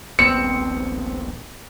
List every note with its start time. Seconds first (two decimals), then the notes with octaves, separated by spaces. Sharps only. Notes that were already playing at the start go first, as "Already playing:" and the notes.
0.19 D#1 A#1 B3 C4 C#7